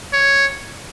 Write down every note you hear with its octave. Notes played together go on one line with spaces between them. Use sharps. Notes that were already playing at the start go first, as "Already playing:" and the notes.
C#5